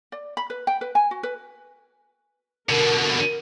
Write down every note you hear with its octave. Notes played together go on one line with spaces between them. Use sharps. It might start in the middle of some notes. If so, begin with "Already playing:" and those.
D5
B5
B4
G5
B4
G#5
F#4
B4
B2 D3 A#4